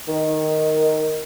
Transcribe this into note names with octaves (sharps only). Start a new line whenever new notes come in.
D#3